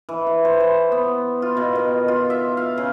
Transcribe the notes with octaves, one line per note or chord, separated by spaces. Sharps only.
E3
B4
C5
C5
B3
F4
B2
D#3
F4
E5
F5
C#3